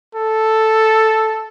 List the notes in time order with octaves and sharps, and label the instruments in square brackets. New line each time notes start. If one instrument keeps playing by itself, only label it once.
[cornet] A4